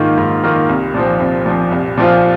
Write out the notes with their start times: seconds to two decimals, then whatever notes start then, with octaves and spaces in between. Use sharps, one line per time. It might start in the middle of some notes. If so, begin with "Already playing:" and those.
Already playing: G#2 D#3 A#3 F4
0.18 G#2
0.43 D#3 A#3 F4
0.69 C2
0.94 A#2 F3 C4
1.20 C2
1.46 A#2 F3 C4
1.71 C2
1.97 A#2 F3 C4 F4